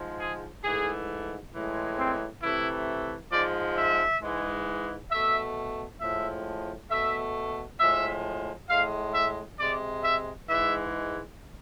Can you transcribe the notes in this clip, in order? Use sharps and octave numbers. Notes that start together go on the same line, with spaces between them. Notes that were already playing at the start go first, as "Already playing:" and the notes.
Already playing: G#2 F3 G#3
G#4
G#2 E3 A3 G#4
A2 E3 G#3
C4
C3 E3 A3 E4
G#2 F3 G#3 D5
E5
G#2 E3 G#3
B2 A3 E5
A2 F3 G#3 E5
B2 A3 E5
A2 F3 G#3 E5
A2 G#3 F5
E5
C3 G#3 D5
E5
G#2 E3 G#3 E5